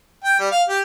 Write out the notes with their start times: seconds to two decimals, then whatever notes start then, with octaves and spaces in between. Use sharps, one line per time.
0.24 G5
0.39 G3
0.51 F5
0.69 G4